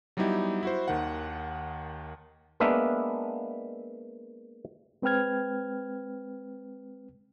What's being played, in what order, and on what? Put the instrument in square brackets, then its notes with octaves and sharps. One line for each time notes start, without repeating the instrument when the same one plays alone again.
[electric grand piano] F#3 G3 B3 D#4 E4 G4
E4 F#4 C5
D#2 D#3 F#5
[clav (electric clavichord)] G#3 A#3 B3 D4 E5 F5
[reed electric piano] G#3 C4 B4 G5 F6 G#6